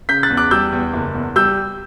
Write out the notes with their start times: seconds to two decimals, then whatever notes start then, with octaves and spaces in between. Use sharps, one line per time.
0.09 C#3 G6 B6
0.23 F#6 A6
0.30 E2
0.37 D6 F#6
0.51 G3 E6 G6
0.73 E2
0.94 F#1
1.15 E2
1.36 G3 E6 G6